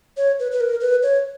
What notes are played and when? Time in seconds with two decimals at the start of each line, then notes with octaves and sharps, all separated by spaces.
0.17 C#5
0.39 B4
0.52 B4
0.61 A#4
0.81 B4
1.03 C#5